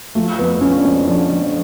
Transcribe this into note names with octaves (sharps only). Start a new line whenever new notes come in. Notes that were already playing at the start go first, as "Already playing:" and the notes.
F3 A3
F2 B3
F3 C#4
D4
F2 C#4
F3 D4
F3